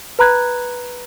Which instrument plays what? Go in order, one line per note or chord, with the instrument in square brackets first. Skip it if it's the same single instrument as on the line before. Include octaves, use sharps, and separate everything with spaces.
[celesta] B4 A#5 B5 F#6 G#6